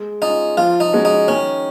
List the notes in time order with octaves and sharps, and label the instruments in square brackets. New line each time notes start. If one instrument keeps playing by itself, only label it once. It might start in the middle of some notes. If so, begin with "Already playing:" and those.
Already playing: [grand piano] G#3
[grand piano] C#4 F4 [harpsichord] D#4
[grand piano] F3 [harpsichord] F4
[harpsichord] D#4
[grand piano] G#3 C#4 F#4
[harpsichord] D#4
[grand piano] D#3 [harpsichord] C#4